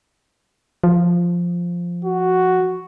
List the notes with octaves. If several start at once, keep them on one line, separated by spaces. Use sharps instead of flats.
F3
F#4